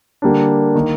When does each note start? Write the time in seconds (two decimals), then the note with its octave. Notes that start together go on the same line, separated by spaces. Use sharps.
0.22 D3 G3 A#3 D4
0.75 D#3 A#3